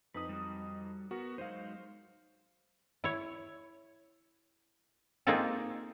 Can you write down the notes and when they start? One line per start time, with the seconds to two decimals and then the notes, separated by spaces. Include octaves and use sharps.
0.14 F2 D#4 B4 D#6
0.29 G3 F#4
1.11 B3 F#4 A#4
1.38 F#3 G#3 D#4 C5 F5
3.04 E4 C#5
5.27 A#3 C4 D#4 F4 G#4 A4